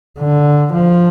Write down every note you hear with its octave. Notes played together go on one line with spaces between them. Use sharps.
D3
F3